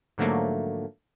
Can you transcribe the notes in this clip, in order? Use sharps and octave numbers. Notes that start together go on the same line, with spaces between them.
G#2 D3 F3 F#3 A3 A#3